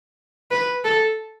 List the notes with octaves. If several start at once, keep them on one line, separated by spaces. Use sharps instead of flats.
B4
A4